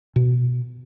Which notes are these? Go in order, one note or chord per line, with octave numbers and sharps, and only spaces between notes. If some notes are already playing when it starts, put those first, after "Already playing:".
B2